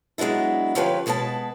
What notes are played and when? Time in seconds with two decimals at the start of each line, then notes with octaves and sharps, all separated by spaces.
0.18 F#3 G#3 B3 D4 E4
0.75 D2 F3 C#4 G4 B4 F5
1.06 B2 G#3 B3 B4 A5